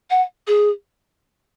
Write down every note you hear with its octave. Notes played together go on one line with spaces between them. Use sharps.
F#5
G#4